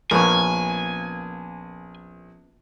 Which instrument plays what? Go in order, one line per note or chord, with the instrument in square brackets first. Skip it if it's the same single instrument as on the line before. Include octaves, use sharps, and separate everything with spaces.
[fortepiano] A#1 [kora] A#3 B3 C#4 [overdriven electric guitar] G#5